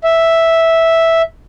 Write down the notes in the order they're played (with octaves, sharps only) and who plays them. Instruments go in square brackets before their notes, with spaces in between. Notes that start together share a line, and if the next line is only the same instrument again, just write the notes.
[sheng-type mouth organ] E5